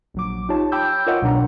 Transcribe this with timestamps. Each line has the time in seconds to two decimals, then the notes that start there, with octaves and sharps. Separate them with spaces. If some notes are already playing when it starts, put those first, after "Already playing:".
0.14 A#1 F#3 D6
0.49 D#4 F4 G4 C#5 A5
0.72 G5 B5 D6 E6 G6
1.06 F4 A#4 C#5 D#5 F#5 G5
1.21 C2 B2 F#3 D4 F#5 A#5